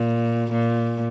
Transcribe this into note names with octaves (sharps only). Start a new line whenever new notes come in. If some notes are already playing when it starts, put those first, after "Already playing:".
Already playing: A#2
A#2